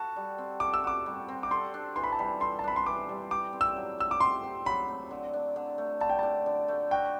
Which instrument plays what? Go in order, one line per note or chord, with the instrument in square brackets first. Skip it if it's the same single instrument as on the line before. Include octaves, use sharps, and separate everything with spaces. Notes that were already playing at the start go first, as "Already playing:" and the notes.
Already playing: [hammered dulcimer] F#4 A4 [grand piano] A5
[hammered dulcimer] G3
C4
[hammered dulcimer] A4 [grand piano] D6
[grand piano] E6
[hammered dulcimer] F#4 [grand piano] D6
[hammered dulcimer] G3
C4
[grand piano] D6
[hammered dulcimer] A4 [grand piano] C6
[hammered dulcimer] D4
[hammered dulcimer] E3 [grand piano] C6
[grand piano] B5
A5
[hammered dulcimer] G3 [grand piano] B5
[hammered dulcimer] A4 [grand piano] C6
[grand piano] A5
[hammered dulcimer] D4 [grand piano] B5
[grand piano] C6
[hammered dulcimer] E3 [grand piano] D6
[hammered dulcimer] G3
[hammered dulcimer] G4 [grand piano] D6
[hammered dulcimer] C4
[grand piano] E6
[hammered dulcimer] F#3
[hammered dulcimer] A3 [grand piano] E6
[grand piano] D6
[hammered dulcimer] G4 [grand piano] C6
[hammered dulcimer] C4
[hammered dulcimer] F#3 [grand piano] B5
[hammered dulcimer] A3
D3
D4
D3
A3
[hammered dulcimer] D3 [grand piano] A5
[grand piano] G5
[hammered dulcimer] D4 [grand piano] A5
[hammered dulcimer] D3
A3
[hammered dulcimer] F#4 [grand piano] G5